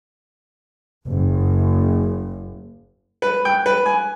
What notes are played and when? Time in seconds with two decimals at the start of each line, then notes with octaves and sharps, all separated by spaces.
1.07 F#1 F#2
3.22 B4
3.45 G5
3.66 B4
3.86 G#5